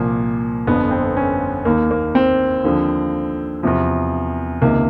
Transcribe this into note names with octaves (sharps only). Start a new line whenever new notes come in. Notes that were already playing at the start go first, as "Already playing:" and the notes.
Already playing: C2 A#2 F3 A#3
G1 F2 D3 B3
C4
C#4
D#2 D#3 A#3
A#3
C4
D#2 D3 F3
E2 C3 F3
C#2 C3 D#3 A#3